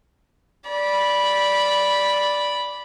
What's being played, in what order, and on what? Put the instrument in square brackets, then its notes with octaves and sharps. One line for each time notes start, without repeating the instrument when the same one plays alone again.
[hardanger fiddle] D5 B5